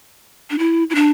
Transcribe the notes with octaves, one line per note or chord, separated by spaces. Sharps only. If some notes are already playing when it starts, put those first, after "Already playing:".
D4
E4
E4
D4